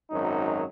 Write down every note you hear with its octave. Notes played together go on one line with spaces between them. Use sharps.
G#1 F#2 F#3 D#4